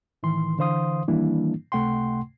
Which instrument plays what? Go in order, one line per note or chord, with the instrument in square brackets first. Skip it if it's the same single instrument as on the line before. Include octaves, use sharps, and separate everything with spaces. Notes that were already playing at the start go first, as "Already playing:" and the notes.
[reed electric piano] A2 D#3 E3 C6
D3 E3 C5 F5 C6 D#6
D#3 E3 G3 A#3 D4 E4
C#2 C3 A3 F#5 G5 C6